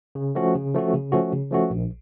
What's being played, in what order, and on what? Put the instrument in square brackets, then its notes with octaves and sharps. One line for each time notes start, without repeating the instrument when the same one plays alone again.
[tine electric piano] C#3
F3 A3 C#4 F#4
C#3
F3 A3 C#4 F#4
C#3
F3 A3 C#4 F#4
C#3
F3 A3 C#4 F#4
A#1